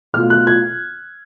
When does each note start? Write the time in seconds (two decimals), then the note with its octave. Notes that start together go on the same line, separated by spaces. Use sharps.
0.14 B2 A3 F4 F6
0.30 F#6
0.47 G#6